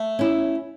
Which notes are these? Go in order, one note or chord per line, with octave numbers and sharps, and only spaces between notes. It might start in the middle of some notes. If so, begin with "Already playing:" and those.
Already playing: A3
C#4 E4